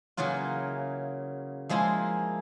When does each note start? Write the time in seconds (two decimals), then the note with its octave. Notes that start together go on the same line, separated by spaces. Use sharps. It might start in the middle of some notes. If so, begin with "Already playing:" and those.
0.17 C#3 E3 F#3 A#3 F4
1.69 F3 G#3 A#3 E4 C5